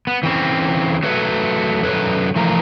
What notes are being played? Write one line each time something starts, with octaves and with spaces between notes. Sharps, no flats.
B3
E3 C4 C#4
F#3 A3 B4 C#5
F#2 A4 B4 C#5
E3 F3 A3 A#4